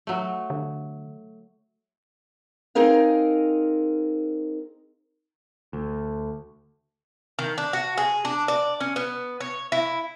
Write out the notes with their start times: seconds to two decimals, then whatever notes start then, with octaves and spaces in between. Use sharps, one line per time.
0.07 F#3 A3
0.50 D3
2.75 C4 D#4 G#4 A#4 F5
5.73 D2
7.39 D#3
7.58 D4
7.73 F#4
7.98 G#4
8.25 D4
8.48 D5
8.80 C#4
8.96 B3
9.40 C#5
9.72 E4